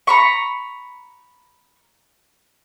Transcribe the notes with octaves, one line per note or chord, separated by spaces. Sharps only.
A#5 B5 C#6